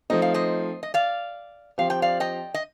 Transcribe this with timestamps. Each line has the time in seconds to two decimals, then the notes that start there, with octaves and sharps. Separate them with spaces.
0.10 F3 A3 C4 D#4 D#5
0.22 F5
0.34 C5 D#5
0.83 D#5
0.94 D5 F5
1.78 F3 C4 G4 C5 F5
1.90 G5
2.02 D5 F5
2.20 D#5 G5
2.54 D#5